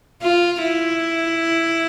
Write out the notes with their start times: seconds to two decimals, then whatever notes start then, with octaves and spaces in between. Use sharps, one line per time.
0.22 F4
0.62 E4